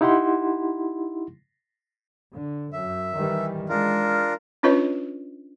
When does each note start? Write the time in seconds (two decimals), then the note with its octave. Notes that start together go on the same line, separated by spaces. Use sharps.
0.01 D#4 E4 G4 F#5 C6
2.33 D3
2.73 F#2 E5
3.18 D#3 E3 G3
3.69 G#3 D4 F4 A#4
4.63 C#4 D4 F4 B4 C#5 D#5